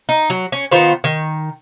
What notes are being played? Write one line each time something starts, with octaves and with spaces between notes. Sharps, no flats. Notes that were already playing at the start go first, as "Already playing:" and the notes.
D#4
F#3
C#4
D#3 B3 F4 C5
D#3